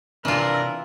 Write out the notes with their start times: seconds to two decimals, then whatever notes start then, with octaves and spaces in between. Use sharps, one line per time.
0.25 C3 E3 D4 F4 A#4